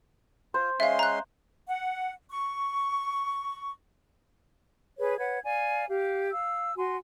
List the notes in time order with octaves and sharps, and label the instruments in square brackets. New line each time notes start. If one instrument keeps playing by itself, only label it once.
[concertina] F4 [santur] C5
[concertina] G#3 C#4 C6 [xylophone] E5 F5
[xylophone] A#5 F#6
[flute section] F#5
C#6
G#4 B4 C#5
B4 C#5 F#5 G#6
D5 F5 G#5
G4 F5
F5 E6
F#4 G#5 C6